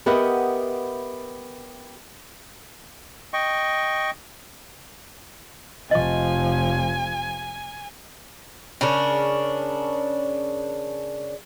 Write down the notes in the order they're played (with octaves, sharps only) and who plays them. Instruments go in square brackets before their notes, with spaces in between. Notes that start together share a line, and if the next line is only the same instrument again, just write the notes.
[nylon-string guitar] B3 G4 A#4 D#5 E5 F#5
[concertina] D#5 G5 C#6
[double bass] F1 F3 [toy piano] D#5 C#6 [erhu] G#5
[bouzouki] C#3 C#4 D4 A#4